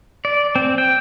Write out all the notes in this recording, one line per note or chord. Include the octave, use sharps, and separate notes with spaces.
D5
C4
G5